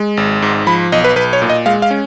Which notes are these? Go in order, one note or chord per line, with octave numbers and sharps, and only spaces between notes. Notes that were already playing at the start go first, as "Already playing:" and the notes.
Already playing: G#3
G#1
G#2
F3 B5
B1 D#5
B4
B1 B4
C#5
A#2
D#5
G#3 F5
F5
C#4